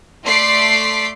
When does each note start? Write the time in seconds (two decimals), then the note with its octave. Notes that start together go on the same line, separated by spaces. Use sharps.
0.25 A3 D5 C6 B6 C7 D7